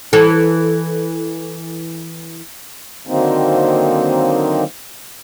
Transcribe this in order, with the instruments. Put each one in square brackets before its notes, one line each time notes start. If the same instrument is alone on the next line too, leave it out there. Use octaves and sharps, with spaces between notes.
[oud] E3 A4
[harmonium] D3 D#3 F#3 A#3 C4 D#4